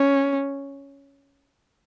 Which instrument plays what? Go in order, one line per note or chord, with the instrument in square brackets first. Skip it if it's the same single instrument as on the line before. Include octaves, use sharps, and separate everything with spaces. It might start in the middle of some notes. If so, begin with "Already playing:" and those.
Already playing: [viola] C#4